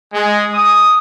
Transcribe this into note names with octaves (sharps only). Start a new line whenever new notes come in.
G#3
D#6